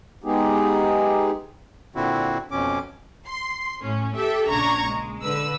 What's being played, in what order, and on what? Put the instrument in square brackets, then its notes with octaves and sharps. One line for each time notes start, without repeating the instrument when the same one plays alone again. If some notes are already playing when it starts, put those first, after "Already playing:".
[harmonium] G#3 B3 D#4 G4 G#4
[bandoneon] A#2 D3 C4 E4 F#4
F2 B2 C#4 D6
[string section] C6
A2 C#4
G4 A4 E5
A#1 C#3 D4 A#5 C#6 G#6
G#3
D3 B4 E6